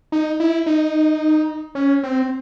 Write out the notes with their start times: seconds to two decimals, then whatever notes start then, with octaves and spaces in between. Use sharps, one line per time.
0.12 D#4
0.40 E4
0.66 D#4
1.75 C#4
2.03 C4